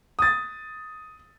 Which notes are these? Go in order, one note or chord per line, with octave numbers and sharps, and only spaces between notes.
D#6 A6